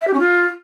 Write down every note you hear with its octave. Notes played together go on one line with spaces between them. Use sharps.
E5
G4
C#4
F4